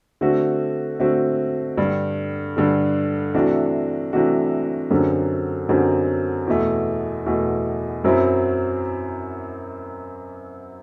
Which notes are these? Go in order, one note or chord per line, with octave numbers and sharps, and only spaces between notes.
D3 A3 C4 F#4
D3 A3 C4 F#4
G2 D3 G3
G2 D3 G3
C3 E3 A3 D4 F#4
C3 E3 A3 D4 F#4
F#2 D3 F#3 C4 G4
F#2 D3 F#3 C4 G4
E2 B2 A3
E2 B2 A3
F#2 F#3 C4 E4